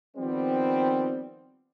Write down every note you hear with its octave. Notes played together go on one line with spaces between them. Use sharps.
D#3 F3 G3 B3 C4